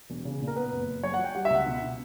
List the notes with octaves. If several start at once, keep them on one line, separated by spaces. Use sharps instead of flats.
E1
C#3
A#2
A#4
B3 B4
F#1
F#1
F#3 C#5
F#5
F#3
G5
G3 F#5
E5
C#2
F#5
B2
B2